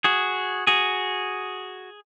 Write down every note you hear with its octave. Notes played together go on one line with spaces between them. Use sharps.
F#4 G#4
F#4 G#4